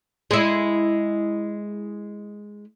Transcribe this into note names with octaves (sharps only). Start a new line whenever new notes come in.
G#3 E4